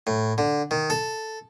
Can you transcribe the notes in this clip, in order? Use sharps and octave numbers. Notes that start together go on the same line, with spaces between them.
A2
D3
D#3
A4